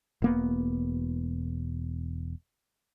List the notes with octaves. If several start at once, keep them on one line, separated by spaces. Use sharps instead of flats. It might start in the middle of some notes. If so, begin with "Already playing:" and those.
E1 A#3 B3